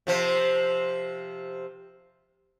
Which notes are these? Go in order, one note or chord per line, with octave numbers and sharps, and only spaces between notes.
C3 F3 C5